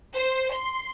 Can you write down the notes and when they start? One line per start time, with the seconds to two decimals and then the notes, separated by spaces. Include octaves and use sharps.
0.15 C5
0.52 C6